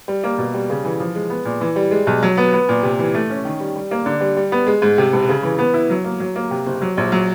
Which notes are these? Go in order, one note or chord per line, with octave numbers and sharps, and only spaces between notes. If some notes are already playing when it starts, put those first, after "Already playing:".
G3
A#3
B2
G3
C#3
E3
F3
G#3
B3
A#2
E3
G3
G#3
B1
F#3
B3
B3
A#2
C3
E3
A3
C#4
D#3
G3
G3
A#3
D3
G3
G3
B3
G#3
G#2
C3
E1
C#3
E3
B3
E4
F#3
A#3
F#3
A#3
C3
F#1
F#3
A#1
F#3